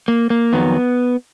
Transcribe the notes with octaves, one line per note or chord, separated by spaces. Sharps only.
A#3
A#3
F2 D#3 F#3 B3